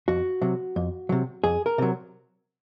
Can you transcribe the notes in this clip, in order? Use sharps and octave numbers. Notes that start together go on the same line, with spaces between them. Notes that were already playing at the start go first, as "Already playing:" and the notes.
F2 F#4
C3 F#3
F2
C3 F#3
F2 G#4
A#4
C3 F#3